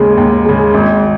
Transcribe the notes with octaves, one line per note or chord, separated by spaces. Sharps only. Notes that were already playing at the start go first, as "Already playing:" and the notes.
Already playing: D#2 C#3 G#3
D#2
C#3 G#3
G#1